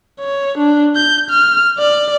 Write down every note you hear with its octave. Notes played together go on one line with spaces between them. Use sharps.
C#5
D4
G6
F6
D5